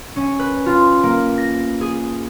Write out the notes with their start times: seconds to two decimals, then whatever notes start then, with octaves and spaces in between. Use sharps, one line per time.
0.16 C#4
0.39 B4
0.66 F4
1.03 A#3
1.38 A#6
1.81 G#4